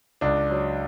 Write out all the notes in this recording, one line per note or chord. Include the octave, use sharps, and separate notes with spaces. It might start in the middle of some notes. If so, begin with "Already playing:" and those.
C#2 D4
F#3